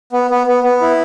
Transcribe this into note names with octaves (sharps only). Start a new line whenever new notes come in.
B3
B3
B3
B3
E4